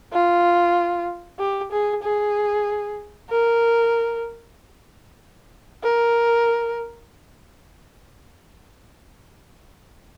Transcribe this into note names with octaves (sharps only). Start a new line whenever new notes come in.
F4
G4
G#4
G#4
A#4
A#4